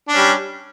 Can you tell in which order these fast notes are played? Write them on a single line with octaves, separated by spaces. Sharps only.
D4 C#4 G3